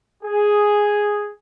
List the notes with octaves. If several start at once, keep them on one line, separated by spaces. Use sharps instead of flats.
G#4